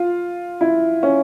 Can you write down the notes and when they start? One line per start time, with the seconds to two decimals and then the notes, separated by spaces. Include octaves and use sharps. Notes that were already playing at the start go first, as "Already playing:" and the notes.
Already playing: F4
0.61 E4
1.03 C#4